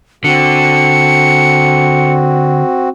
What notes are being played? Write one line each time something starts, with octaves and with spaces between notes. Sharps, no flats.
D3 C4 F#4 C#7